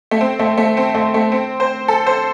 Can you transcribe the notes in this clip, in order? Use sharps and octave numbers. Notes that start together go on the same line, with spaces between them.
A3
C4
A3
A3
C4
A3
A3
C4
C5
A4
C5